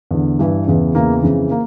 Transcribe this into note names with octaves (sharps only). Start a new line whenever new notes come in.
E2 D3
G2 E3
E2 C#3 E3
E2 C#3 E3 A#3
F2 C#3 E3
A#3